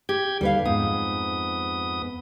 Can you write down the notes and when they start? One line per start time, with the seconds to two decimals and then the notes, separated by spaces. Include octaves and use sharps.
0.09 G4 G5 G#6
0.41 D#2 D3 G3 B4 F5
0.65 F2 G#2 B3 D#6